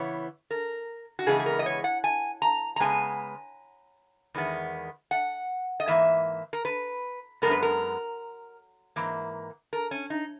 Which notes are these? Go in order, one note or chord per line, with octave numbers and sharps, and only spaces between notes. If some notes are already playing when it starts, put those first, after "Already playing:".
Already playing: C#3 E3 B3 C#5
A#4
F#4
C#3 E3 G#3 B3 G#4
G#4
A#4
D#5
C#5
F#5
G#5
A#5
A#5
C#3 G#3 B3 G#5
E2 D#3 G#3 B3
F#5
D#5
G#2 E3 A#3 E5
A#4
B4
F#2 C#3 G#3 B3 A#4
B4
A#4
G#2 E3 A#3
A#4
C#4
D#4